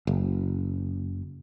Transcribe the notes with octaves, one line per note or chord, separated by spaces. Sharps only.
F#1